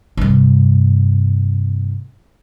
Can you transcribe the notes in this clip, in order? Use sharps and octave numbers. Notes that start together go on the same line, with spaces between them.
G2 C3